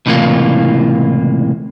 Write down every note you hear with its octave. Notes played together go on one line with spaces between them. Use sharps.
C#2 A2 C3 E3 A#3 F4